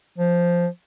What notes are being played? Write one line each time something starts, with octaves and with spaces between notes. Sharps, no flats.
F3